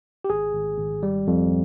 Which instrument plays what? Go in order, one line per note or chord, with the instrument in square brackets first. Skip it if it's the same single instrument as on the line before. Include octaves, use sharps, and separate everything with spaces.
[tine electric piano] G4
G#1 G#4
G#1
G#1
G3
F2